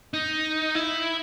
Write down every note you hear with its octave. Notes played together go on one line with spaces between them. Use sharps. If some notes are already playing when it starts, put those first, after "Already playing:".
D#4
E4